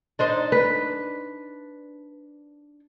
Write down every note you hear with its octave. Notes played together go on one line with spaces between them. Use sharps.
D4 D#4 C5
B4